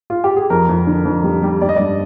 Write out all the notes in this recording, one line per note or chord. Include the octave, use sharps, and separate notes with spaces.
F4
G4
G#4
F2 A#4
F2
D3
F2
G3
G3
G3 D5
D#5
G2 D5